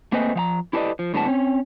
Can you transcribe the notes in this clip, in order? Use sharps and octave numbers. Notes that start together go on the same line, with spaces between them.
A3 A#3 C4 G#4 B4 D#5
F3 F5 A#5
E4 G4 A4 B4 D5 D#5
F3
A2 D3 F#3 G#3 B3 A5
C4 C#4